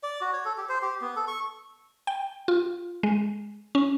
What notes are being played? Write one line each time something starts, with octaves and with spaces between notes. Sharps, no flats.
D5
F#4
C#5
A4
G4
C5
G4
B3
A4
C#6
G5
F4
G#3
C#4